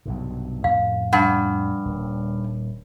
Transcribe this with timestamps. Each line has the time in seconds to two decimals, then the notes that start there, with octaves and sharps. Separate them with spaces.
0.06 B1 G2 C3
0.64 F2 A2 C#4 F5
1.13 G2 F#5
1.85 D#1